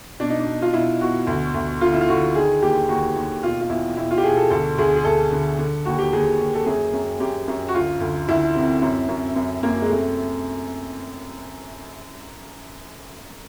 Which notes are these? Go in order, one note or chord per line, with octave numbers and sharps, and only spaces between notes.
B2 D4
D#4
D4
B2
F4
B2 E4
B2 F#4
D2
D2
D3 F4
E4
F4
D3 F#4
D#3 G#4
D#2 G4
D#2 F#4
D#2
B2 F4
F4
E2 E4
B2 E4
F4
G4
B2 G#4
A4
D2 A4
D2 G#4
G#4
D2 A4
D3
D3
D#2 F#4
G4
D#2 G#4
D#2
A4
F#2 G#4
F#2
F#2 G4
F#2
F#4
D2 F4
D2
D2 E4
C3
F#2
F#2
F#2
F#2 A#3
G#3
C3 A3